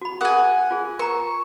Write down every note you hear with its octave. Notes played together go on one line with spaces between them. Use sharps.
F#4 B5
G#4 A#4 F#5 G#5 D#6
F4 G#4
A#4 A#5 C#6